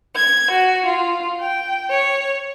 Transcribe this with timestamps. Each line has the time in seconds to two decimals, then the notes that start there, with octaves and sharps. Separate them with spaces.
0.14 G#6
0.52 F#4
0.86 F4
1.41 G5
1.90 C#5